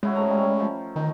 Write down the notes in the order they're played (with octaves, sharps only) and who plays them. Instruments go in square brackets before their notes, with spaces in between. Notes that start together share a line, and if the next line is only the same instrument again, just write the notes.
[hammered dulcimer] C#3 E4 F#4 [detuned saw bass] G#3
[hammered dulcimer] G#2 A3 A#5
G3 C#4
F3
[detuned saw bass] D#3 [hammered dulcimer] D#4